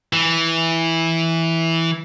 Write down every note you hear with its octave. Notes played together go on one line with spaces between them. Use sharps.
E3